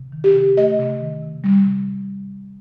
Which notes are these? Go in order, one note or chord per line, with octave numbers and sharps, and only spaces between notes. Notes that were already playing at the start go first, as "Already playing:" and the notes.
Already playing: C3
D#3
G4
C3
A3 D#5
C3
D#3
C3
G3
C3